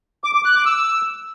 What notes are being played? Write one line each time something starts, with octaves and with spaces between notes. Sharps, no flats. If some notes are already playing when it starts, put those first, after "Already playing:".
D6
D6
F#6
D6
E6